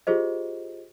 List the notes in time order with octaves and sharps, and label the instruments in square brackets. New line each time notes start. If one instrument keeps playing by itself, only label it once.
[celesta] F4 G4 G#4 C5 D#5